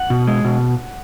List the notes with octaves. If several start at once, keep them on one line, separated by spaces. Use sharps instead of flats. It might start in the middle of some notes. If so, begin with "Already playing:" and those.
Already playing: F#5
B2
G#3
B2